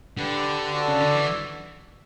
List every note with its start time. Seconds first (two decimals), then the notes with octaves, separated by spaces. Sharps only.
0.18 D3 G4 B4 D5 F#5
0.72 D4 F#4 A4 D5
0.88 C#3
1.00 D3
1.13 E3